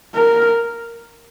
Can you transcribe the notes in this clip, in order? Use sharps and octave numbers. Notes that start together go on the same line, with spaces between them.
A#4